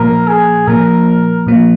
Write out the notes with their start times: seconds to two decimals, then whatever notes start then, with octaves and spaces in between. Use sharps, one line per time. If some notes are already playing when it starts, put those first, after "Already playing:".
Already playing: A#2 F3 A#3 A#4
0.28 G#4
0.67 A#2 F3 A#3 A#4
1.47 A#2 F3 A#3